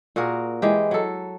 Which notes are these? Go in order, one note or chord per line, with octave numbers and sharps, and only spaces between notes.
A#2 F#4 G#4 A#4
E3 G#3 G4
F#3 A4